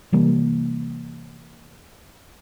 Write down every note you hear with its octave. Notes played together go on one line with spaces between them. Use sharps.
C3 E3 G3 A#3